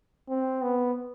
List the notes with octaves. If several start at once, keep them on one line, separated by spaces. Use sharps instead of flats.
C4
B3